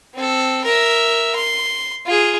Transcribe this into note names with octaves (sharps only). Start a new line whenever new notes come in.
C4 A4
A#4 E5
C6
F4 G#4